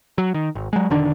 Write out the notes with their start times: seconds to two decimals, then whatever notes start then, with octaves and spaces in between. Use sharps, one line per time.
0.18 F#3
0.35 D#3
0.55 G#1
0.73 F#3 G#3
0.90 E1 D3 D#3 D4